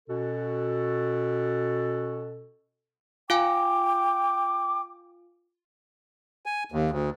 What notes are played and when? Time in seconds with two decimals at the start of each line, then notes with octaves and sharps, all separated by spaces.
0.09 B2 C#4 F#4 A4
3.30 F4 F5 G5 G#5 D6
6.46 G#5
6.72 D#2
6.91 D2